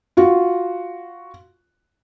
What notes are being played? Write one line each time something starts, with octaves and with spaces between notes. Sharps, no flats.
F4 F#4